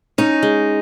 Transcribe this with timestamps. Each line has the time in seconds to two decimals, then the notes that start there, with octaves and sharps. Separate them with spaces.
0.18 C#4 D#4
0.43 G#3